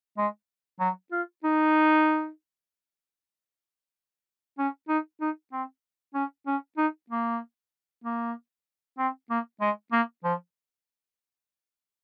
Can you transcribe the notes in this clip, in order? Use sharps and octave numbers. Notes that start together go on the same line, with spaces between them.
G#3
F#3
F4
D#4
C#4
D#4
D#4
C4
C#4
C#4
D#4
A#3
A#3
C4
A#3
G#3
A#3
F3